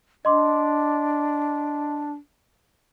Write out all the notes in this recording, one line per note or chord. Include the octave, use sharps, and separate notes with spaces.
D4 D#5 C6 D6